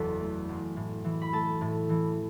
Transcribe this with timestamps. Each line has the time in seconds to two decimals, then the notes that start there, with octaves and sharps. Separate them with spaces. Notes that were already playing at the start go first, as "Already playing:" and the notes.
Already playing: F#1 E2 A4 B4
0.20 A3
0.49 F#1
0.76 A2
1.04 E3
1.22 B5
1.32 A3 A4 A5
1.61 A2
1.89 E3